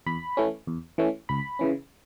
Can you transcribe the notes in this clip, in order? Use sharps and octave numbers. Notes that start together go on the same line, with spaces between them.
E2 B5
E3 A3 C#4
E2
E3 A3 C#4
C#2 B5
C#3 E3 C#4